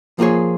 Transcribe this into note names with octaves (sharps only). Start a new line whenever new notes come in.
F3 A#3 F4 G#4 C#5